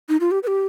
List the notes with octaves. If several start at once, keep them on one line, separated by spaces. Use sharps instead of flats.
D#4
F4
G4
B4
G4